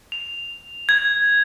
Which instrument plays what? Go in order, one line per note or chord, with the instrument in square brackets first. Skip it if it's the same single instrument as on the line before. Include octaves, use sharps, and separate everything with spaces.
[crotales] F7
G#6